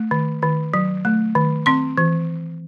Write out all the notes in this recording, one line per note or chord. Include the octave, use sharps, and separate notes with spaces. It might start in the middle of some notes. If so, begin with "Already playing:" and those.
Already playing: A3
D#3
D#3
F#3
A3
D#3
C4 C6
E3